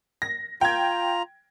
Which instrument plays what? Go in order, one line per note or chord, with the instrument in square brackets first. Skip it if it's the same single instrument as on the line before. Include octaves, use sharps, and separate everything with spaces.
[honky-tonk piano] A#6
[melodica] F4 A#5 [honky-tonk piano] G5 G#6